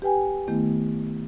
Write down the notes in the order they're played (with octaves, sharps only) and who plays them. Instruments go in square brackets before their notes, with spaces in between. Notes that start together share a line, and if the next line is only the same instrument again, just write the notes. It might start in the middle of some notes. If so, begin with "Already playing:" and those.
[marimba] G4 B4 G5 G#5
D#3 A3 B3 E4